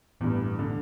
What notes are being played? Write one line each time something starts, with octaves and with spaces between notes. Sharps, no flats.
A1 E2 G2
D3